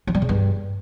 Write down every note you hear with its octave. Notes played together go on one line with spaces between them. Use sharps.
F#3
G3
C#3
G2